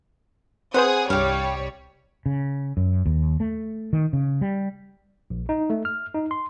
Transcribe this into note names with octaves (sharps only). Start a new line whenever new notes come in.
C4 G#4 B4 C5 F#5 D#6
C2 G2 G3 G4 C#5 F5
C#3
F#2
D#2
A3
D#3
C#3
G3
A#1
D#4
A3
F6
D#4
C6